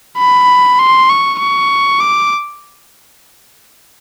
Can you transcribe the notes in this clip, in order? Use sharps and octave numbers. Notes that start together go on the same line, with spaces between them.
B5
C6
C#6
C#6
D6